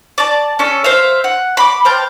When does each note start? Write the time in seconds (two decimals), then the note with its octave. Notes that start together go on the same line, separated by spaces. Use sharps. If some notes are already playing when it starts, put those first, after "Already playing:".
0.18 D5 A5
0.59 C#4 A4
0.84 C5 E5 F5
1.24 F#5
1.57 B5 D6
1.85 C5 F5 G5 A5